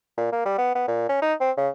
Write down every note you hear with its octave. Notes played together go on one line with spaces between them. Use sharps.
A#2
A#3
G3
B3
B3
A#2
C#4
D#4
C4
C#3